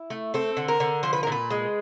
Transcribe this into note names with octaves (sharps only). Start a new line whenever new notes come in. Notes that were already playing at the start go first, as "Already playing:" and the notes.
Already playing: E4
A3
C4 A4
D3
A#4
D3
F3 C5
B4
A#4
A#2 B4
G#3